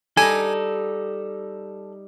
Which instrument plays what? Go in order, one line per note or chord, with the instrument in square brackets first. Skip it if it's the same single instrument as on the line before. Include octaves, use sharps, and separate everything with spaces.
[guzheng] G3 D#4 [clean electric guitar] A4 [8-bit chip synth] G#5